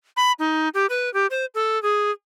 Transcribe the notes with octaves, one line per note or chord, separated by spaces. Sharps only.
B5
D#4
G4
B4
G4
C5
A4
G#4